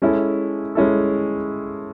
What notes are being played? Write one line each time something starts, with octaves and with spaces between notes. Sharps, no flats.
G#3 C#4 E4 A4
G#3 C#4 E4 A4